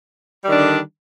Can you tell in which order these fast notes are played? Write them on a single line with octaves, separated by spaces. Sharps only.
G3 D#3 D4 D3